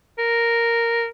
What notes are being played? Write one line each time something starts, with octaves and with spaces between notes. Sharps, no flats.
A#4